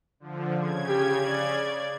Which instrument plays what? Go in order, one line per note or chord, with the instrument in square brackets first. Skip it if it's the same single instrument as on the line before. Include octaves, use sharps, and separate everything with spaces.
[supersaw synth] D3 F3
C#3 G#6
[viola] G4
D5